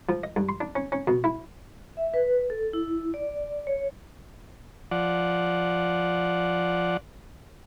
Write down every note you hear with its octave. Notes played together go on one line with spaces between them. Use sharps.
F3
D#5
G2
C6
D4
C#4
C#4
B2
E4
E5
B4
A4
E4
D5
C#5
F3 D5 F#5